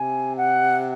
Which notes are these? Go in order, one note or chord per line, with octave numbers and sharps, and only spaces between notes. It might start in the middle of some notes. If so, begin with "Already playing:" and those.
Already playing: C3 G#5
F#5